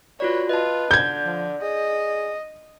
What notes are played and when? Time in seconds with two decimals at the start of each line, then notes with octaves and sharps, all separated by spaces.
0.20 F4 F#4 B4 C#5 D5
0.49 F4 B4 D#5 A5
0.91 D3 D5 G6 G#6
1.26 F3
1.62 G#4 D#5